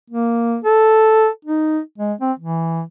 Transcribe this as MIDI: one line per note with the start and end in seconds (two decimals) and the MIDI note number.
0.10 0.57 58
0.65 1.28 69
1.45 1.79 63
1.98 2.13 56
2.21 2.32 60
2.39 2.82 52